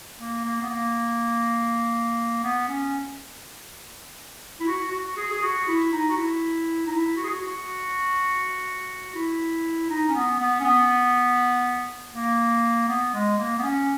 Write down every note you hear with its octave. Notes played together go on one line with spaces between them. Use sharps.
A#3
A#3
B3
A#3
B3
C#4
E4
F#4
F#4
G#4
G#4
F#4
E4
D#4
F#4
E4
D#4
E4
F#4
G#4
F#4
F#4
E4
D#4
C#4
B3
B3
C#4
B3
A#3
B3
G#3
A#3
B3
C#4